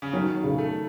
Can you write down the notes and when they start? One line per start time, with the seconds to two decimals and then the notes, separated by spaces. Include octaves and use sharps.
0.02 C#3
0.13 D#3 F#3
0.43 C#3
0.58 A3